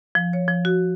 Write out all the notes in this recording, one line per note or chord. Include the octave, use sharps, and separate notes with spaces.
F3
C#5
F3
F#4